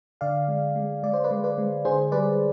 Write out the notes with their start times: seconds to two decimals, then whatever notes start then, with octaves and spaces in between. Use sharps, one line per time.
0.21 D3 D5 F5
0.48 G#3
0.75 G#3
1.03 G#3 D5
1.13 C5
1.24 B4 D5
1.31 G#3
1.44 B4 D5
1.58 G#3
1.85 D3 G#4 C5
2.12 G3 B4 D5